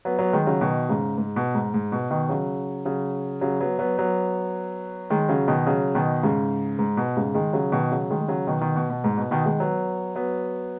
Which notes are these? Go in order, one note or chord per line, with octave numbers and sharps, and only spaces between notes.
F#3 B3
F#3 B3
D#3 G#3
C#3 F#3
B2 D#3
G#2 C#3
G#2
B2
G#2
G#2
B2
B2 D#3
C#3 F#3
C#3 F#3
C#3 F#3
F#3 B3
F#3 B3
F#3 B3
D#3 G#3
C#3 F#3
B2 D#3
C#3 F#3
B2 D#3
G#2 C#3
G#2
B2
G#2 C#3
D#3 G#3
C#3 F#3
B2 D#3
C#3 F#3
D#3 G#3
G#3
C#3 F#3
B2 D#3
B2 D#3
B2
B2
G#2
B2
B2 D#3
D#3 G#3
F#3 B3
F#3 B3